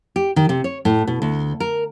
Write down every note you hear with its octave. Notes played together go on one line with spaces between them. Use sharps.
G4
D#3
C3
C#5
A2
B2
D2
A#4